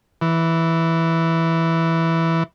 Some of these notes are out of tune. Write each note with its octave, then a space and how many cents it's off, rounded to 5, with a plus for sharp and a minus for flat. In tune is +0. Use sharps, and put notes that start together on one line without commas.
E3 -5